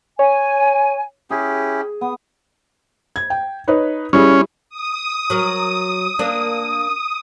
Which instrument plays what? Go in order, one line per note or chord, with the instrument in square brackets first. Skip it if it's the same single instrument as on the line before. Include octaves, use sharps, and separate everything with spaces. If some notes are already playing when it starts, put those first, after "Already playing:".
[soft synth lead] C#5 [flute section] G#5
[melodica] C#4 E4 G4 [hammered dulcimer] G#4
[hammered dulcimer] B3 [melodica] D#6
[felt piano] G#6
G5
D#4 B4 C#5
[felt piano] G3 E4 G#4 [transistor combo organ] C#4
[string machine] D#6
[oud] F#3 A#4
A#3 D4